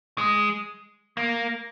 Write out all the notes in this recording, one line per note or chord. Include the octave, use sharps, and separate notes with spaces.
G#3
A#3